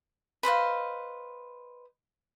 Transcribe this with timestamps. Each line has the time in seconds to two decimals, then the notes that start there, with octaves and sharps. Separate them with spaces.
0.43 B4 C5 D#5 F5